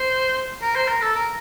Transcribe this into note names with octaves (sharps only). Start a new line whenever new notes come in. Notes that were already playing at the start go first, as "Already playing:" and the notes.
Already playing: C5
A#4
C5
A#4
A4
A#4